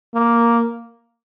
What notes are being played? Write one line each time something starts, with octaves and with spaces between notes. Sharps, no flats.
A#3